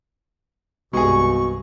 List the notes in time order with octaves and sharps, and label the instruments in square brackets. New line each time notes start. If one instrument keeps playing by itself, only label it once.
[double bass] C2 G2 [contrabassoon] B2 [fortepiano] G#3 G#4 [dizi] C#6